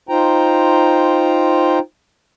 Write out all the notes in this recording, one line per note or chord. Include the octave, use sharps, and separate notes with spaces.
D#4 F4 C5 G5 A#5